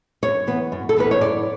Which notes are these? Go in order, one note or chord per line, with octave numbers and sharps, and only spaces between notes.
F#2 C#5
E3 B3
F#2
A4
E3 B3 B4
C#5
F#2 D5